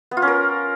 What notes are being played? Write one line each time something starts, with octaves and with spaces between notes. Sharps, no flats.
B3
F4
C#4
A#4